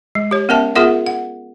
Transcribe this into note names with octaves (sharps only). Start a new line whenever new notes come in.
G#3
G4 C#5
B3 C#4 A#4 E5 A5
B3 F4 G#4 A#4 E5 F#5
F#5